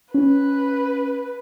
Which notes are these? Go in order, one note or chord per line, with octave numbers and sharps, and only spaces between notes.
C#4 B4